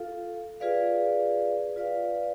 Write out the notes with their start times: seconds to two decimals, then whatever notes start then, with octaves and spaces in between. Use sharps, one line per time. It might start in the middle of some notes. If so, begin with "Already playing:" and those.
Already playing: F4 A4 F5
0.60 F4 G#4 B4 D5 F5
1.76 F4 B4 D5 F5